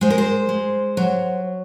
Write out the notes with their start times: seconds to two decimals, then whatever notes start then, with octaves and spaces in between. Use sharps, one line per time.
0.01 G#3 C5
0.10 A#4
0.18 C5
0.49 G#3
0.97 F#3